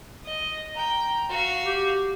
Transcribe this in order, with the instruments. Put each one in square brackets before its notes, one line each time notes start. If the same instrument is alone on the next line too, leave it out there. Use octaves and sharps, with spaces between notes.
[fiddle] D#5
[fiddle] G5 [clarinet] A#5
[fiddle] F#4 F5
[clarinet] G4